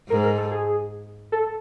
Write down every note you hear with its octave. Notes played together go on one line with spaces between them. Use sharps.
G#2 A#4
A#4
A4
G#4
A4